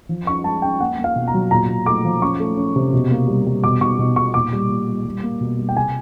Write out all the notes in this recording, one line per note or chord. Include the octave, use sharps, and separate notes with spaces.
F3
C#4 C#6
G#3 A5
C#4 G5
A#3 F#5
A#3
F5
B2
A#5
F#3
A#2 A#5
A#2
A3 D6
F3
C#4 C#6
A3
C#4
C3
B2
A#3
G3
G3
B2 D6
B2 C#6
B2
B2 C#6
A#2 D6
G3
A#2
G3
G3
A#3
B2
G3
G5
C3 G#5